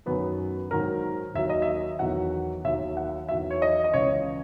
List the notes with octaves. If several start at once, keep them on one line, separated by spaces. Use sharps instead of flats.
F#2 D#3 F#3 B3
G#2 D#3 F#3 A#4
D#2 D#3 F#3 E5
D#5
E5
E2 D#3 F#3 F#5
D#2 D#3 F#3 E5
F#5
E2 D#3 F#3 E5
C#5
D#5
D#5
C#2 C#3 E3 C#5